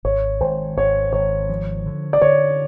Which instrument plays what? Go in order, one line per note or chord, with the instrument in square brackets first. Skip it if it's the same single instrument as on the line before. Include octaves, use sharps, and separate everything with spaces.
[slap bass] G#1 [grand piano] C#5
[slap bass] G#1 [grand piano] C5
[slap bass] G#1 [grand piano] C#5
[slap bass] G#1 [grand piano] C#5
[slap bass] F3
D3
[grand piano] D5
[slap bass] D3 [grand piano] C#5